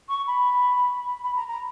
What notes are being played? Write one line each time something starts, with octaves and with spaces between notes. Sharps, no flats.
C#6
B5
B5
A#5
A#5